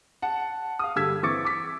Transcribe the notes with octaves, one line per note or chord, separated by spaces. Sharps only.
F#5 A5
F5 D#6
G2 D3 G4 E6 G#6 B6
E3 C4 C#6 D6 A6 C#7
D6 B6